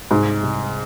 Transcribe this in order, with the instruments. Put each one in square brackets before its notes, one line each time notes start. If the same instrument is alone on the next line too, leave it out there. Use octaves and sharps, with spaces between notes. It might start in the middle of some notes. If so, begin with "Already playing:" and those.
[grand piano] C2 [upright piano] G#2
[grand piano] C2